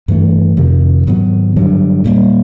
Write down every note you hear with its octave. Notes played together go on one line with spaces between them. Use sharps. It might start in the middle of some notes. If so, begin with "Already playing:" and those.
G2 E3 A3
F2 C3 D#3
G#2 D#3 F#3 B3
G2 D3 F#3
A#2 G3 A#3